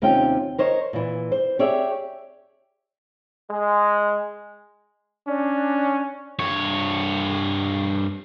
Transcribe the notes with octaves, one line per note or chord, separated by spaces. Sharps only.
D#2 C3 C#4 F4 G5
A#4 C5 C#5 D#5
A#2 E3
C5
G4 G#4 C#5 D5 E5
G#3
C#4 D4
G2 C#5